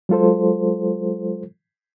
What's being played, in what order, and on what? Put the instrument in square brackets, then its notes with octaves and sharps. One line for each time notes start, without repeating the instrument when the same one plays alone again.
[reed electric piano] F#3 G#3 F4 A4 C5